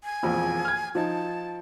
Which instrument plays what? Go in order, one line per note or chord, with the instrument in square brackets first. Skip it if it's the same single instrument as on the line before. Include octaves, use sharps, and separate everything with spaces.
[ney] G#5
[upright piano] E1 A#1 F2
F6 G#6
[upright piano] F3 D#4 [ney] A5